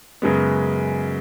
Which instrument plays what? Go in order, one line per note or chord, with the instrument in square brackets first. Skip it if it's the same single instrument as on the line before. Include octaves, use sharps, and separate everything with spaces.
[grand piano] F#2 C#3 G#3 B3